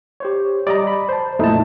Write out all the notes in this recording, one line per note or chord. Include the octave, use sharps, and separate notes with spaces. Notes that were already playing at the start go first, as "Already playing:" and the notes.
G4 C5 C#5
G3 D5 D#5 A#5
B5
C5 A5
F2 A#2 A3 D#4 E4 A5